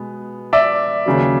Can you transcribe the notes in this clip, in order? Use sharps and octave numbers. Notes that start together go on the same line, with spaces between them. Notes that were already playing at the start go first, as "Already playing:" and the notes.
Already playing: B2 G#3 B3
D5 E5
D#2 C#3 F#3